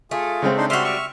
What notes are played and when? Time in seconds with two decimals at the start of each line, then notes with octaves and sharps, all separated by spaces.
0.11 A3 F4 G#4
0.42 C#3 G#3 C4
0.57 D4 D#4 C5
0.70 G3 F#4 E5 C6 F6
0.84 E5 C#6 F6